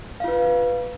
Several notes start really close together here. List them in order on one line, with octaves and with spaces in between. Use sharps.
F5 F4 B4